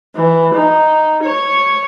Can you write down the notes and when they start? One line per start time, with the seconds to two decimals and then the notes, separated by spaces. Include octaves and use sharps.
0.16 E3
0.54 D#4
1.24 C#5